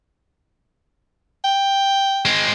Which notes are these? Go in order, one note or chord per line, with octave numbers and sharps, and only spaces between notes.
G5
G#3 C4